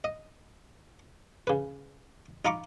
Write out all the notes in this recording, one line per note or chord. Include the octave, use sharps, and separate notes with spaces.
D#5
C#3 B4
D#4 F4 A#5 B5 C#6 D6